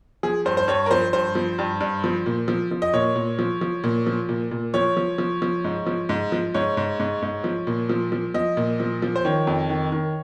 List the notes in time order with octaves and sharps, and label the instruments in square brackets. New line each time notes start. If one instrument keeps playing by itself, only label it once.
[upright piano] F3 G#4
G2 C5
C5
G2 C#5
A#4
F3 C5
G2 C5
F3
G2
G2
F3
A#2
F3
F3
D#5
A#2 C#5
A#2
F3
F3
A#2
F3
A#2
A#2
F3 C#5
F3
F3
F3
G#2
F3
G#2
F3
G#2 C#5
G#2
G#2
G#2
F3
A#2
F3
F3
F3 D#5
A#2
F3
F3
C5
D#3 C#5
F2
D#3
D#3